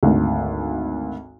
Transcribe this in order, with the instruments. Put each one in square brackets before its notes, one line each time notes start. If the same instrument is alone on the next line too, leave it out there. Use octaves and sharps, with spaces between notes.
[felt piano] G#1 D2